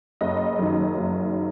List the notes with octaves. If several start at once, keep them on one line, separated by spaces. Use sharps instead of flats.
F#1 D#5
F#2 D#3 F#3
F#1